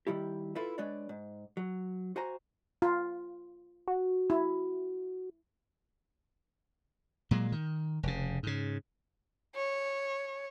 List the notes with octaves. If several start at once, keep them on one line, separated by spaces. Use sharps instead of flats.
D#3 G3 E4 G4
E4 F4 A4 B4 E5
G#3 D4 B4 C#5 D5
G#2
F#3
F#4 C5 G#5 A#5
F4
F#4
E4
A#2 F#3 G#3
D#3
F1 C#3
G#2 C#3
C#5